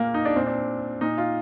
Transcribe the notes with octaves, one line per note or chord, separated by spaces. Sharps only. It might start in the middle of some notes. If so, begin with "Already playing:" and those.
Already playing: A#2 A#3
D#4
D4
A#2 C4
D4
A#2 D#4
F4